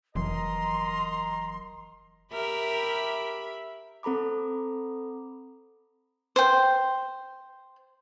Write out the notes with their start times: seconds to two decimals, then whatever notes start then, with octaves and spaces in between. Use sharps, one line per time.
0.15 F1 E3 F#3 A#4 D#5 A#5 C6
2.32 G4 A#4 E5 B5
4.03 C4 A4 A#5 B5 D6
6.36 C5 G5